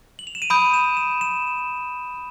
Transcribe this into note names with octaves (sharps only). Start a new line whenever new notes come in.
F#7
F7
E7
D#7
B5 D#6 G6 D7
E7
E7
E7